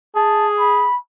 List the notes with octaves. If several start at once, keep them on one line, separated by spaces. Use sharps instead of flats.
G#4 A5
B5